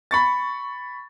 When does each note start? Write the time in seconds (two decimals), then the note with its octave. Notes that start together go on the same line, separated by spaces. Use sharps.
0.11 B5 C#6 A6